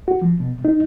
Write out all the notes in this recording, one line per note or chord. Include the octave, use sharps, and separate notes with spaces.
F#4
F3
B2
D#4